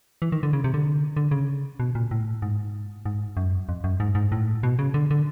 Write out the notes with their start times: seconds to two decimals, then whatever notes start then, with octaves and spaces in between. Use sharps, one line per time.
0.22 E3
0.32 D#3
0.43 D3
0.53 C#3
0.64 C3
0.74 D3
1.17 D3
1.31 C#3
1.80 B2
1.95 A#2
2.11 A2
2.42 G#2
3.05 G#2
3.37 F#2
3.69 F2
3.84 F#2
4.00 G#2
4.15 G#2
4.32 A2
4.63 B2
4.79 C#3
4.94 D3
5.11 D3